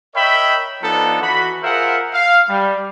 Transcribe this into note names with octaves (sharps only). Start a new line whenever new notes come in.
A#4 C#5 D#5 E5 G5 B5
F3 B3 D4 D#4 F4 A4
E3 F#4 B5
F4 G#4 A#4 C5 E5 F#5
F5
G3